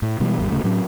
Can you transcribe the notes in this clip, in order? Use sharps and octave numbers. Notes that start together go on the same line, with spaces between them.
A2
B2 E3 G3 G#3
G#1 E2 G3
D#1 C#2 C#3 A3
A2 F#3 C#4